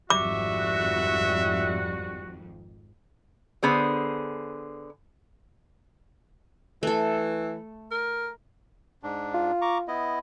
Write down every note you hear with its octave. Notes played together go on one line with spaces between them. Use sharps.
G#1 F2 G#2 G3 F#4 E5 D6
D3 B3 G#4 C5
E3 A3 A4
A#4
G#2 D4
F4
A#5 C#6 D6
B3 E4 D#5